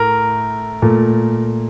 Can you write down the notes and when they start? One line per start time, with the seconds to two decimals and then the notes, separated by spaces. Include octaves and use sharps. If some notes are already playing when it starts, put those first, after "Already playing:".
Already playing: A2 A3 A#4
0.82 A#2 A3